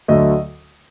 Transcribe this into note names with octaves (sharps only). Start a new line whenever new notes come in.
D2 D3 F#3 A3 D#5